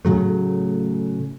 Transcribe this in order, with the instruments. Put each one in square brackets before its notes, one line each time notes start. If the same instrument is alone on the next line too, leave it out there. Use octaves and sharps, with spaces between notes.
[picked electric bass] A2 C#3 F#3 A3